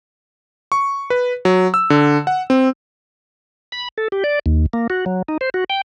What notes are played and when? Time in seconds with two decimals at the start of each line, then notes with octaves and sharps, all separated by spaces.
0.72 C#6
1.10 B4
1.45 F#3
1.74 E6
1.90 D3
2.27 F#5
2.50 C4
3.72 B5
3.98 A4
4.12 G4
4.24 D5
4.46 D#2
4.73 A#3
4.90 F#4
5.06 F#3
5.28 D#4
5.41 C5
5.54 F#4
5.70 G5